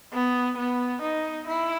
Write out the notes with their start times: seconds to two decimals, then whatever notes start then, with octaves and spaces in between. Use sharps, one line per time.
0.13 B3
0.57 B3
1.01 D#4
1.47 E4